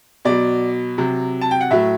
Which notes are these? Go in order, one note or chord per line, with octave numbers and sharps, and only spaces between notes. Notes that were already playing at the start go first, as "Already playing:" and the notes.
B2 F#3 D5
C3 F#3
A5
G5
F#5
A2 F#3 E5